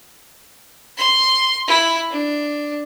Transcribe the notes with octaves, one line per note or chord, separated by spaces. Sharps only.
C6
E4
D4